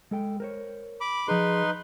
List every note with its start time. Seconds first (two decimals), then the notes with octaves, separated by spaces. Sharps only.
0.11 G#3 A4 G5
0.40 A#4 C5 C#5
1.01 B5 D6
1.28 F3 D#4 G#4 B4 C6